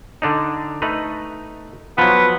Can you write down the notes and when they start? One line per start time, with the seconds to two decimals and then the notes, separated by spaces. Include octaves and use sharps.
0.22 D3 D4 D#4
0.82 A3 D#4 B4
1.98 F3 F#3 B3